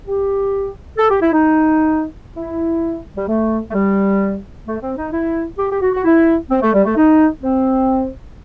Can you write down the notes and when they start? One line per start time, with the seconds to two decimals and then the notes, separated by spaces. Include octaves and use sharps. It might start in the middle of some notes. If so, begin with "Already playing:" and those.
0.06 G4
0.98 A4
1.09 G4
1.21 E4
1.32 D#4
2.36 E4
3.16 G3
3.28 A3
3.70 A3
3.74 G3
4.66 A3
4.81 C4
4.96 D#4
5.12 E4
5.58 G4
5.70 G4
5.81 F#4
5.93 F#4
6.04 E4
6.50 C4
6.62 A3
6.73 G3
6.84 A3
6.96 D#4
7.42 C4